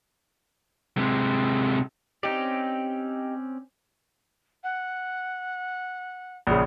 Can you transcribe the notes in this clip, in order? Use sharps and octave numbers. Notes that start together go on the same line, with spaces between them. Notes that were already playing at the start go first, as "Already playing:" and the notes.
C3 G#3
C4 C#4 D#4 G4 D5
F#5
A#1 C#3